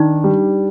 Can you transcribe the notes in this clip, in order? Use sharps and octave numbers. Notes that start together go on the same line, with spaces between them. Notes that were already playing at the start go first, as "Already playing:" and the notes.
Already playing: D#3 D4 D#4
G3